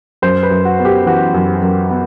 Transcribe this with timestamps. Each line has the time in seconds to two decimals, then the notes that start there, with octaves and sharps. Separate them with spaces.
0.22 F#2 C5
0.43 B4
0.51 F#2
0.65 F#4
0.79 B3
0.85 G4
1.06 E3 F#4
1.34 F#2
1.62 F#2
1.90 B3